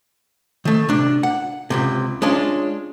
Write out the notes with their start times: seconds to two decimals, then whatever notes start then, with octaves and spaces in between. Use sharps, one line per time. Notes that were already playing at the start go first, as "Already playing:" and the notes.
0.65 D#3 A3
0.89 C3 D4
1.23 F#5
1.70 C#2 G2 C3
2.22 G#3 C#4 D4 F4